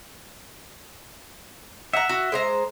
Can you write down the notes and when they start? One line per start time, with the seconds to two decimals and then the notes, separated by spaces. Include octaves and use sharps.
1.93 E5 F#5 A#5
2.09 F#4
2.32 G#3 C5 A#5